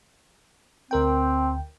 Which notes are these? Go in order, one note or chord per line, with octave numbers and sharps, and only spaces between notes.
D2 C4 A#4 G5